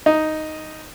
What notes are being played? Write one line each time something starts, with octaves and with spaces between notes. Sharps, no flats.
D#4